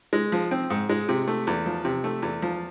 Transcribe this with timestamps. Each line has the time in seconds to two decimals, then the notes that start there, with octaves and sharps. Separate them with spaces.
0.13 G#3
0.32 F3
0.51 C4
0.70 G#2
0.89 G#3
1.09 C3
1.28 A3
1.47 E2
1.66 F3
1.85 C3
2.04 A3
2.22 E2
2.42 F3